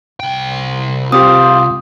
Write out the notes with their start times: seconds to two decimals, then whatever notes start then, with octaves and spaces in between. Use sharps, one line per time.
0.20 C2 G5
1.12 C4 F4 G4 D#6